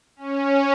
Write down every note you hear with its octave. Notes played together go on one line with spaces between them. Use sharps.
C#4